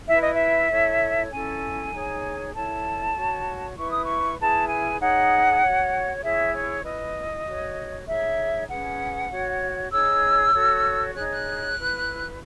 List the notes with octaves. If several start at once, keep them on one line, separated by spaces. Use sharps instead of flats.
E4 B4 E5
D#5
E5
E4 A4 C#5
C#4 E4 A4 G#5
D#4 G#4 C#5
E4 A4 C#5 A5
F#4 C#5
E4 B4 C#6
D#6
C#6
E4 G#4 B4 A5
G#5
D#4 G#4 C#5 F#5
F#4 C#5
E4 G#4 C#5 E5
C#5
E4 B4 D#5
F#4 C#5
D#4 G#4 C#5 E5
C#4 G#4 B4 F#5
F#4 C#5
D#4 G#4 C#5 E6
F#4 A4 C#5
D#4 G#4 C#5 F#6
F#6
E4 B4